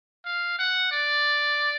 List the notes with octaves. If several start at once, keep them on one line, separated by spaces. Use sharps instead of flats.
F5
F#5
D5